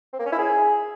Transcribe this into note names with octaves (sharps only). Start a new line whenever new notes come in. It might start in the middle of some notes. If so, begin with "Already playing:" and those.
C4
A#3
C#4
E4
G#4